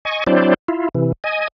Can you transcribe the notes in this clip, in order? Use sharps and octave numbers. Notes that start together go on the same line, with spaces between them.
D#5 G#5 C#6
F#3 C4 D4 E4 C5 D5
E4 F4
C3 E3
D#5 G#5